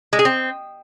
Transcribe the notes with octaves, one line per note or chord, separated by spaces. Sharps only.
G#3
G#4
C4